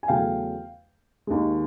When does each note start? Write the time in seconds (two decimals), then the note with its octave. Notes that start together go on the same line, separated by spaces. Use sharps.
0.03 G#5
0.08 E2 C#3 F#3 A3 F5 G5
1.27 D#2 D#3 G#3